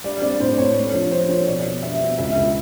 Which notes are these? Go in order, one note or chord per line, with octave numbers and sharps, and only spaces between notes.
G3 D5
C4 D5
A2 C5
C4 C#5
A3
F3 C#5
F3 C5
F3 C#5
B2 D5
B2
G3 E5
B2
C#2 E5
C#2